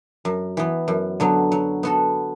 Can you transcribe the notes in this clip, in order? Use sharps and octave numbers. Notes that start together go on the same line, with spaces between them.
F#2
E3 B3
F#2
D3 F#3 B3
F#3
B3 F#4 A4